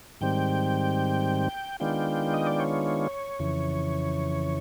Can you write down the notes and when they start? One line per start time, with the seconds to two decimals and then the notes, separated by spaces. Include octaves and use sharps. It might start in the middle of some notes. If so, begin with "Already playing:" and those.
0.21 G#2 D#3 G3 C4 G5
1.80 D#3 G#3 B3 D4 F4 G5
2.34 D#5
2.47 D5
2.60 C#5
3.39 F2 C#3 E3